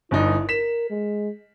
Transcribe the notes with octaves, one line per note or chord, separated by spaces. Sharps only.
G1 G2 D#4 E4
A#4 B6 E7
G#3